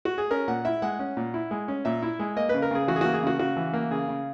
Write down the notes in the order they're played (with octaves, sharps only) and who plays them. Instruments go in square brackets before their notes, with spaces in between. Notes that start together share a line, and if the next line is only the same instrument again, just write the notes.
[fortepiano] F#4
G#4
C#4 A#4
A#2 F#5
E4 E5
G#3 F#5
C#4
A#2
E4
G#3
C#4
A#2 E5
E4
G#3
A#3 D#5
C#3 B4
A#4
C#3 G#4
E3 F#4
G#4
A#3 F#4
G#4
C#3 F#4
C#3 F#4
E3
A#3
C#3 G#4
C#3